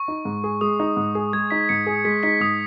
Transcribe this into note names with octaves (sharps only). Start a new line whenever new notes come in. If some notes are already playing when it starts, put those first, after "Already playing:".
Already playing: C#6
D#4
G#2
G#4
G#3 D#6
D#4
G#2
G#4
G#3 G#6
D#4 B6
G#2 C#7
G#4
G#3 B6
D#4 B6
G#2 D#6